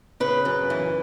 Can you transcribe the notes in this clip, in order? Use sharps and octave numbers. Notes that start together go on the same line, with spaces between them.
C#3 B4
F#2
E3